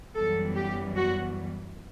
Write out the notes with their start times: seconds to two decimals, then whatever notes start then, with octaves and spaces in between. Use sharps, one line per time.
0.14 F#2 E3 G3 B3 A4
0.55 G4
0.96 F#4